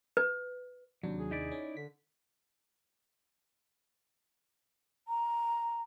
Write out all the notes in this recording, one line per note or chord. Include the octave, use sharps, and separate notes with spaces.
B4
D#2 C3 F#3 D4
G#4
D#4 E4 D5
C#4
D3 B6
A#5